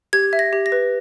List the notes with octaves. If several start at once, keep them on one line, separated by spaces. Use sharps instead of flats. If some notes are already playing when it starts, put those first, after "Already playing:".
G4 G#6
E5
A#6
G4
A#6
B4